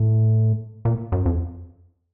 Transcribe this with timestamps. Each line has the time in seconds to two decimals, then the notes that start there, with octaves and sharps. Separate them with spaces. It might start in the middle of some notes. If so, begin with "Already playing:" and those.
Already playing: A2
0.85 A#2
1.12 F#2
1.26 F2